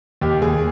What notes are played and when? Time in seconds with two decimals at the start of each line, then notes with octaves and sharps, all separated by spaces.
0.21 D#2 G4
0.42 D#2 G#4